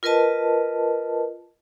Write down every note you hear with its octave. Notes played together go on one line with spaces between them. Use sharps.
F4 A#4 B4 D#5 A5